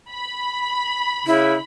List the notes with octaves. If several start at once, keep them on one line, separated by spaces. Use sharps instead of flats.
B5
C#3 E4